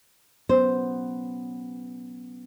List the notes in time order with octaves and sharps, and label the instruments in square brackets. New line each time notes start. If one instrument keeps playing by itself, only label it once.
[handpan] F#3 B3 C#4 [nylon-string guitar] C5